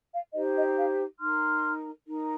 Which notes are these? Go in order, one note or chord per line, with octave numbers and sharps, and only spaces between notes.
F5
D#4 G4 C5 D#5
D#5
F5
D#4 A#4 C6 F6
D#4 A#4